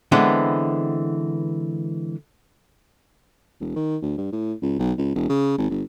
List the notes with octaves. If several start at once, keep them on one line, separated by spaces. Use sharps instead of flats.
D3 E3 G#3 B3 C4
E1
D#3
D2
G2
A2
C#2
B1
C#2
E1
C#3
G#1
G1